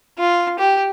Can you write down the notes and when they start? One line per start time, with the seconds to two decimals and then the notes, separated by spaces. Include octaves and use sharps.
0.19 F4
0.59 G4